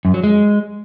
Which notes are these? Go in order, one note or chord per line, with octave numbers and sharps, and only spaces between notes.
F#2
F#3
G#3